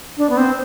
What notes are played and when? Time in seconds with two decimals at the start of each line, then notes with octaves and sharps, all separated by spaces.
0.17 D4
0.30 B3
0.37 C4